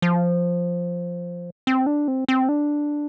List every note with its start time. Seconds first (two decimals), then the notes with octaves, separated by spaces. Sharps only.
0.02 F3
1.67 C4
1.86 D4
2.08 C4
2.28 C4
2.49 D4